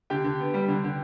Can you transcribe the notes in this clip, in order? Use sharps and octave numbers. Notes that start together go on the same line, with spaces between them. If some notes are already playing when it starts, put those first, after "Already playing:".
D3 G4 G5
D3
B3
G3
D3
D3